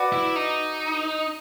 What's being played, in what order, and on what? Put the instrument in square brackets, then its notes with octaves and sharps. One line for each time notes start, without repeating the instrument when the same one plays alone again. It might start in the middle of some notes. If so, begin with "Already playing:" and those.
Already playing: [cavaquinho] F#4 B4 D5
[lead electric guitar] E4
D#4